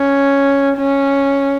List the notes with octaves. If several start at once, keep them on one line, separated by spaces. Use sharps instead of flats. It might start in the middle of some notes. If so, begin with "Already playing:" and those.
Already playing: C#4
C#4